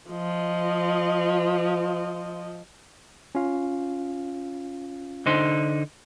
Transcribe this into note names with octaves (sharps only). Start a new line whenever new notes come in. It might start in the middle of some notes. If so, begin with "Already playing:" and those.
F3 D#5
C#4 F4 F5
D3 D#4 C5